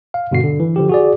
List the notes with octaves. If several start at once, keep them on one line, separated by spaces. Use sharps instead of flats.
F5
G2 B2 D3 F#4 C7
D3
E3
D3 F3 G4
F#4 G#4 D5